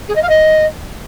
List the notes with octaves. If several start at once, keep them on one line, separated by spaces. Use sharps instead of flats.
G#4
D#5
F5
D#5